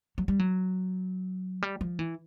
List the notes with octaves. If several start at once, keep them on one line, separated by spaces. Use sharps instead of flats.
F#3
G3
F#3
G3
F3
E3